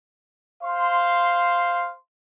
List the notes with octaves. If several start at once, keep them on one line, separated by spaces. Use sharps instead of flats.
C5 F5 C6